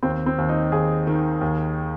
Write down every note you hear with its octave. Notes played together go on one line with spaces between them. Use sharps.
D#2 C4
C4
D#2
D#4
D#2 G#4
D#3
D#2